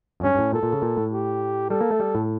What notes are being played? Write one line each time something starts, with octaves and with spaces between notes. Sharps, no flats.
F2
G2 C#4
G2
A2
A#2 A4
A#2
C#3
A#2
A2
G4
G3 A4
A#3
A3
G3
A2